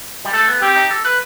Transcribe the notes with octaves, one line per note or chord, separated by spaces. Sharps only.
G3
A3 A4
B3
C4 G4
D#4
A4
B4